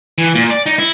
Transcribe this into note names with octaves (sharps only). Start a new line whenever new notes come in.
E3
A#2
D5
D#4
E4